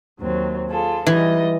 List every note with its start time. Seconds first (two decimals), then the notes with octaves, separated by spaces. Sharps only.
0.21 D#2 F#3 C4
0.69 F4 G#4 A4
1.07 G#2 E3 G3 D#5